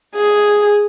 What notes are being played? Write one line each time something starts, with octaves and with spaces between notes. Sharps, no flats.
G#4